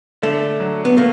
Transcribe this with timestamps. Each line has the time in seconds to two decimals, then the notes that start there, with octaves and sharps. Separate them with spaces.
0.22 D3 A3
0.60 F#3
0.85 B3
0.97 A3 A#3